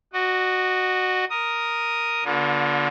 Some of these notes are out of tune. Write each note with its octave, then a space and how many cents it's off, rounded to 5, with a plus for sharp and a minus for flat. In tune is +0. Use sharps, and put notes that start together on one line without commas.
F#4 +0 D#5 -30
A#4 +0 D#6 +0
D3 -20 A#3 +45 F4 +30